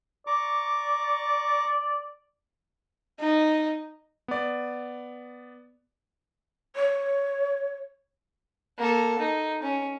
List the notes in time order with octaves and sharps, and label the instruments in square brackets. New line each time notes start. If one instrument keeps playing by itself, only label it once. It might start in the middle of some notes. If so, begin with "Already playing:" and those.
[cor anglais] D5 [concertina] A#5 C#6 D6
[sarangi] D#4
[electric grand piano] B3 D5
[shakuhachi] C#5
[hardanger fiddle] A#3 A4
D#4
C#4